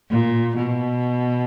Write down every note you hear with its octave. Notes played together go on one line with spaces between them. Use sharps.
A#2
B2